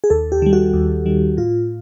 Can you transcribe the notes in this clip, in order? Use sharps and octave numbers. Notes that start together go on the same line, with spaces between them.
G#4
D#2 A4
G4
D#3 G3
F#4
D#2
D#3 G3
A2 F4